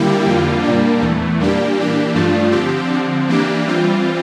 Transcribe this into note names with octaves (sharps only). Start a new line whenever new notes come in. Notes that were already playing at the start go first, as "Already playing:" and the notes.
Already playing: D3 G3 A#3 E4 G4
F2 D3 G3 A#3 F4
A#2 G3 A#3 D4
E2 E3 A3
A#2 G3 A#3 D4 G4
E3 A#3 D4 G4
G2 F3 A3 D4 F4
D3 F3 C4 G4
D3 F3 C4
E3 A#3 D4 G4
E3 G3 C4 F4